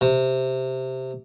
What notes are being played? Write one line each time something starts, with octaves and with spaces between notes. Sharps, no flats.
C3